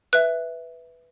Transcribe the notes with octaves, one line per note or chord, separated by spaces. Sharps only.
B4 E5 F#6